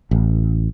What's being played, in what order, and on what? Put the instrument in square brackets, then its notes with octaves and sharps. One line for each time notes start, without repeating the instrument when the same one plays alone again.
[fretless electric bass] A1